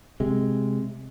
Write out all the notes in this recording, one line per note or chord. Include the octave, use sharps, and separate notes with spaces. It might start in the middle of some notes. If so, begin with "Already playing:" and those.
C3 G#3